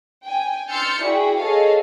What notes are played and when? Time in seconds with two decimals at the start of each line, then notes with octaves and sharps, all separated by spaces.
0.25 G5 G#5
0.69 C6 E6 F6 G6 A6 C#7
1.03 E4 F#4 G#4 D5 G5
1.38 G#4 A4 C#5 D#5 F5